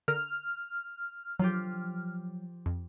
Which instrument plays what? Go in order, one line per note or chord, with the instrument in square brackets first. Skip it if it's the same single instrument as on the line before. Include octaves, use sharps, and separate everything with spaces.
[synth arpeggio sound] D3 A#4 [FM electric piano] F6
[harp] F3 F4 G4 [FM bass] F#3
[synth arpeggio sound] F2